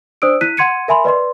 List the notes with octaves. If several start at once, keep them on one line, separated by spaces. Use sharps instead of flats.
D4 C5 D5 D#6 E6 D7
E4 F#6 B6 D#7
F#5 C6 G#6 C#7 D#7
A#4 E5 G#5 B5 C6
B4 D5 D#5 C6